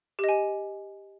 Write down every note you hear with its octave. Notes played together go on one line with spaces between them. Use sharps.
G4 D#5 G#5